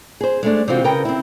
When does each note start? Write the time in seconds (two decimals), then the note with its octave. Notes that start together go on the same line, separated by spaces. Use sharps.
0.21 G#4 C5
0.43 G#3 A3 D4
0.68 C3 E3 C4 F4 F#4
0.84 C#3 A#4 B4 G5
1.05 C4 E4